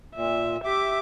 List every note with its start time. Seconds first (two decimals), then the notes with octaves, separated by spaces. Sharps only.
0.16 A#2 E5
0.64 G4 E5 D6